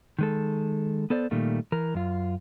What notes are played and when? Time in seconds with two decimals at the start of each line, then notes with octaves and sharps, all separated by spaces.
0.19 D#3 G#3 A4
1.10 B3 A4 C5 D5
1.31 A#2 D#3 G3 A3
1.72 E3 A#4
1.94 F#2 F4